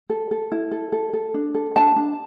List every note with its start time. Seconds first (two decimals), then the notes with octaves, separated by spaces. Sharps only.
0.10 A4
0.31 A4
0.52 E4
0.71 A4
0.92 A4
1.13 A4
1.34 D4
1.54 A4
1.76 D4 A5
1.96 D4